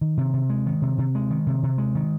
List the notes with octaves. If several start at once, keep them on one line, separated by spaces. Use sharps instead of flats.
D#3
C3
C3
G#3
D#3
C3
C3
G#3
D#3
C3
C3
G#3
D#3